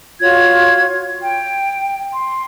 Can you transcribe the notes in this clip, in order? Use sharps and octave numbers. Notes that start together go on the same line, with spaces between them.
F4 F#4 C#5 G#6
G5
C6